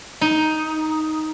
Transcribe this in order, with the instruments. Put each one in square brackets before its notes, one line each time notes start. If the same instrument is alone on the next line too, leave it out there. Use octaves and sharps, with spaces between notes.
[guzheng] D#4